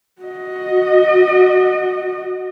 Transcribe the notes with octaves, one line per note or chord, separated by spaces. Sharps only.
F#4 D#5